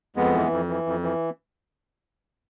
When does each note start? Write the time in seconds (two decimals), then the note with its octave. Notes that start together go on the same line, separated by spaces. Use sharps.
0.16 F2 G#3 B3
0.34 E3
0.52 F2
0.68 E3
0.86 F2
1.03 E3